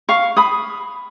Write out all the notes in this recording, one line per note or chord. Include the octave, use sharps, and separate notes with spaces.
F5 C#6
B5 D#6